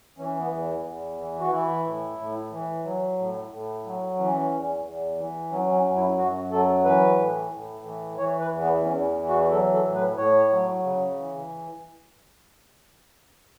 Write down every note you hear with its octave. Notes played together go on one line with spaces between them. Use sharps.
E3 C#4
B3
E2
E2
E3
F#4
E3 E4
A2
A2
E3
F#3
A2
A2
F#3
E3 C#4
E2
E2
E3
F#3 C#4
C#4
F#2
E4
F#2 F#4
F#3 A4
E3 B4
A2
A2
E3
E3 C#5
B4
E2
B3
E2 C#4
E3
F#4
F#3 A4
A4
A2
B4
A2 C#5
F#3
C#3
E3